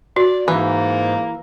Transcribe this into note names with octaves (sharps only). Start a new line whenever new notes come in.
F#4 D5
G#2 E3 A#3